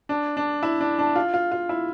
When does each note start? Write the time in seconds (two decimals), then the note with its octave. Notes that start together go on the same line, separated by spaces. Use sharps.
0.09 D4
0.37 D4
0.63 E4
0.81 D4
0.99 D4
1.16 F4
1.34 F4
1.52 F4
1.69 E4